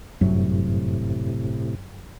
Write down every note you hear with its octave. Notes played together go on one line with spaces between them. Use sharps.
G1 F#2 A2 C3 F#3